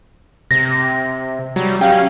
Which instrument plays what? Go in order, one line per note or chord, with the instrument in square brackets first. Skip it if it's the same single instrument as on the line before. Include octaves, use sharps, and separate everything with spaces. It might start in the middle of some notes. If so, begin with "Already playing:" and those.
[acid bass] C3 [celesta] A#6
[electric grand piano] F#3 [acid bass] G3
[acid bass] C#4 [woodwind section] G4 F5 [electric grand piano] G5